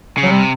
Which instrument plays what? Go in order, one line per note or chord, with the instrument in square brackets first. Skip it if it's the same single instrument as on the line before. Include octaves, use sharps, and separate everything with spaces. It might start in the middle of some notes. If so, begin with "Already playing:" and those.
[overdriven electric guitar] C#3
[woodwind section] F#3
[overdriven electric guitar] C3 [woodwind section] G3